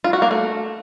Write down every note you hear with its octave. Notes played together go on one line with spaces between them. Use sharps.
F4
F#4
A#3
A3